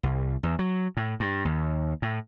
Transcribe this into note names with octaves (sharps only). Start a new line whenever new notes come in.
C2
E2
F#3
A2
G2
D#2
A2